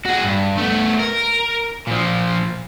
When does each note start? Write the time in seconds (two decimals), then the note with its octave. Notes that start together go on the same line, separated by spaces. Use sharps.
0.05 F#4 G#4
0.24 G2
0.57 A3 B3
0.99 A#4
1.87 A#2 F3